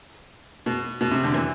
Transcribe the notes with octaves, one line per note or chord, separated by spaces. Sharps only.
B2
B2
C3
D3
E3